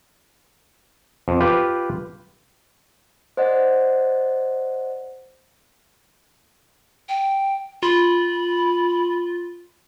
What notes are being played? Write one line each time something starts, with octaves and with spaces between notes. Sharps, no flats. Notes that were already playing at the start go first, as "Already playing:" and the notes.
F2
F4 G4 B4
C5 D5 D#5 F#5
G5
F4 B5